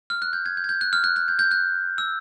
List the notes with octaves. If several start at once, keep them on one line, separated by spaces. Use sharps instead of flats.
F6
F#6
G6
G#6
G6
G#6
G6
F#6
F6
F#6
F#6
G6
G6
F#6
E6